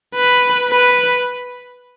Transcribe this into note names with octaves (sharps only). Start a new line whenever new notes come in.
B4
B4